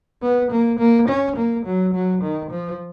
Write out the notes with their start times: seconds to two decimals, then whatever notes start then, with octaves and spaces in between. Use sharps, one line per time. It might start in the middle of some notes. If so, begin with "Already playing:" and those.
0.22 B3
0.51 A#3
0.79 A#3
1.09 C#4
1.37 A#3
1.66 F#3
1.94 F#3
2.23 D#3
2.51 F3